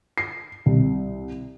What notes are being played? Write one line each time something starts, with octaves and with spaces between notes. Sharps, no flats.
C7
C2